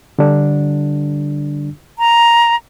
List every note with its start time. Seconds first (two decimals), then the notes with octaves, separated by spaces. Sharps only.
0.19 D3 G3 D4
1.99 A#5